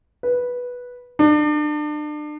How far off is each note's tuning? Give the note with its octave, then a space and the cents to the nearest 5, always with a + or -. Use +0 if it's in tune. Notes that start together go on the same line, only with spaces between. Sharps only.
B4 -10
D4 +35